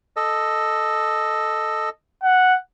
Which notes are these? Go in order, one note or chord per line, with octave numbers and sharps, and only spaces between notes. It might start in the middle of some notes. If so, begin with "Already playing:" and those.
A4 D#5
F#5